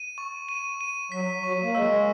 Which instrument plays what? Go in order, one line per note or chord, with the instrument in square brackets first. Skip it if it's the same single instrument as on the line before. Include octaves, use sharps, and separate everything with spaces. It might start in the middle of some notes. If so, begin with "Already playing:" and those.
Already playing: [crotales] D#7
C#6
D#7
D#7
[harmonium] F#3 [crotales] B6
[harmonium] F#3 [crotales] C#6
[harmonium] A#3
[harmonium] G#3 [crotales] E6